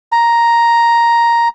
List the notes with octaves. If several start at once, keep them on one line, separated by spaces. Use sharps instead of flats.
A#5